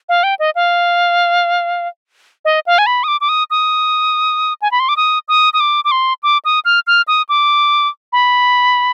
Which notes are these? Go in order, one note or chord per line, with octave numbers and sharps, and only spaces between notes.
F5
G5
D#5
F5
D#5
F5
G#5
B5
D#6
D6
D6
D#6
D#6
G#5
B5
C6
D6
D#6
D#6
D#6
D6
D6
C6
D6
D#6
F6
F6
D#6
D6
B5